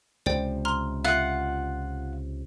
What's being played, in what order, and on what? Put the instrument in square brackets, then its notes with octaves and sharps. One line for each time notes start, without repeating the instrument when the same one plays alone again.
[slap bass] C#2 C3 [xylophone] C5 D5 G5
[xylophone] A#5 C6 F6
[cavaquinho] F4 F#5 [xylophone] E5